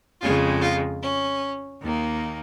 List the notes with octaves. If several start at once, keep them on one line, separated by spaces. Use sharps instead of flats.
F2 C#3 G#3 F4
F4
C#4
D#2 D#3 A#3